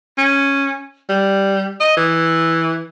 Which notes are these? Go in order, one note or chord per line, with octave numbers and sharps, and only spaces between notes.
C#4
G3
D#5
E3